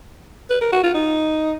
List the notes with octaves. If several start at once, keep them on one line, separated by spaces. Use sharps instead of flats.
B4
A#4
F#4
F4
D#4